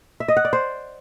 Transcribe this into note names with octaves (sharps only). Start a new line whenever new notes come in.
E5
D#5
F#5
D5
C5